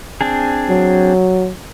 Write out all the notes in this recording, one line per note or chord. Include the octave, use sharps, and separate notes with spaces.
C4 D4 G#4
F#3